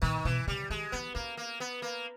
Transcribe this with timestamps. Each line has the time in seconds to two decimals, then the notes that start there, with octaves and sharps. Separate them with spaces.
0.02 A#2 D#3
0.25 B2 E3
0.47 C#3 G3
0.70 D#3 G#3
0.92 E3 B3
1.15 A#3 C#4
1.37 A#3
1.60 B3
1.82 A#3